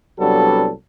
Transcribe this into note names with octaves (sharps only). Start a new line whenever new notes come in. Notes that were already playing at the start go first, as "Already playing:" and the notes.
C2 F#3 G3 B3 D4 A4